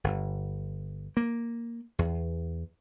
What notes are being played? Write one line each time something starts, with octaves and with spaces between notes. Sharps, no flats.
G1
A#3
E2